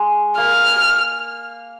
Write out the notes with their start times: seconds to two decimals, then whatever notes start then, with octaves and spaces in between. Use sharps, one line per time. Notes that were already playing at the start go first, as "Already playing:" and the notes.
Already playing: G#3
0.37 A#3 F6